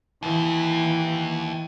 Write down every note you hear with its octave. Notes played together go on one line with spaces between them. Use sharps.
D#2 E3